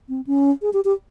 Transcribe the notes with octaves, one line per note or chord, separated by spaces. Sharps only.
C4
C#4
G#4
G4
G4